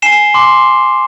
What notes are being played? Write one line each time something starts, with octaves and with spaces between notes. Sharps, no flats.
G#5 C7 E7 G7
C6 D6